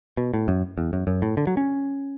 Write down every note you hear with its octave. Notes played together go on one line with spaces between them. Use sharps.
B2
A2
F#2
E2
F#2
F#2
A2
D3
F#3
C#4